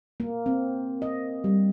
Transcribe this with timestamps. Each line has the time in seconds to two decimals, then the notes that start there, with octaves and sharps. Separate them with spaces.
0.20 A#3
0.46 C4
1.02 D#5
1.44 G3